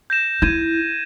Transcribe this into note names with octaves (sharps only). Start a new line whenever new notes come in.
G6 A#6 E7
E4 G6 G#6 D#7